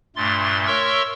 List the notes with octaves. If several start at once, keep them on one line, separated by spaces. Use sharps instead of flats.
G2 A#2 A3 C6 A6
A#4 C#5 E5 C6 C#6 E6